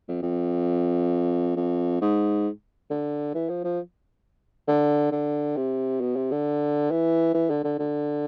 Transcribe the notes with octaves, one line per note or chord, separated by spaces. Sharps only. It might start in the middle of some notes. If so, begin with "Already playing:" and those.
F2
F2
F2
G#2
D3
E3
F3
F3
D3
D3
C3
B2
C3
D3
E3
E3
D3
D3
D3